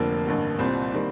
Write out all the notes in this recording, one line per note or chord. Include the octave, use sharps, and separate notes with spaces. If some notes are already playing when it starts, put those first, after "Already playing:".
Already playing: F1 F2 D3 F3 A#3
A1 G2 D3
C2 A#2 G3 C4
D#3 G3 A#3